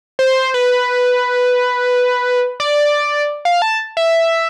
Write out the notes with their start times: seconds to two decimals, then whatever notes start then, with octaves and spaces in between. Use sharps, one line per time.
0.19 C5
0.54 B4
2.60 D5
3.45 F5
3.62 A5
3.97 E5